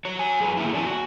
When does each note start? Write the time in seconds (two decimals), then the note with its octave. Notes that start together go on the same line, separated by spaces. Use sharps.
0.05 F#3 C#5
0.19 F#4 G#5
0.40 F#2 G#4 B4
0.57 D#3 A3 A#3 E4
0.73 F2 C#4 D5 G#5 A5
0.85 F#4